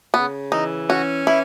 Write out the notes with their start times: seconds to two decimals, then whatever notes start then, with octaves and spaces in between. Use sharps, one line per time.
0.14 C#3 B3
0.51 E3 D#4
0.89 C#4 F#4
1.27 E3 E4